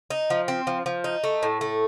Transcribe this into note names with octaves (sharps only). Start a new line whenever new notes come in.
D#4
F3
C4
F3
F3
D#4
A3
A2
A3